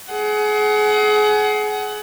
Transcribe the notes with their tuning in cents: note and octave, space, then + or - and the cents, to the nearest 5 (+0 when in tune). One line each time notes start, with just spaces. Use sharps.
G#4 +30 F#5 +25